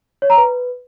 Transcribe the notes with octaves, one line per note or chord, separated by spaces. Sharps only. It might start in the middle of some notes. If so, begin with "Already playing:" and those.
C#5
A#5
B4